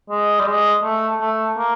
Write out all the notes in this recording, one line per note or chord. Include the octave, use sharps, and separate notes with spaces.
G#3
G3
G#3
A3
A3
A#3